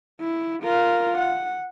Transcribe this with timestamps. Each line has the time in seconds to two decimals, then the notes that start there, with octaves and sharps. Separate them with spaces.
0.21 E4
0.63 F4 A#4
1.18 F#5